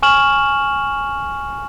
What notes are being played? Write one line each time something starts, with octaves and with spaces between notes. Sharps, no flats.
G#5 C#6 F6 E7 F#7